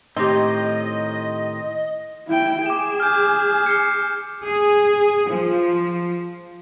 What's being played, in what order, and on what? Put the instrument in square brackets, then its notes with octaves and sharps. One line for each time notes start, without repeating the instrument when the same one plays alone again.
[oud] A2 G4 [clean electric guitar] D#3 C4 D#4 [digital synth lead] D#5
[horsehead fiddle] E4 G5
[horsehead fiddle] G#4 [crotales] D6 E7
[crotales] F6 G6
F6 C7 C#7
[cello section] G#4
F3